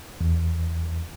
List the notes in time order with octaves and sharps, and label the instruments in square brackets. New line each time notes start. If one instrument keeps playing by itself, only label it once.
[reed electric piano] E2